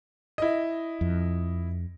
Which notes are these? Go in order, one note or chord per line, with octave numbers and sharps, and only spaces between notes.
E4 D#5
F2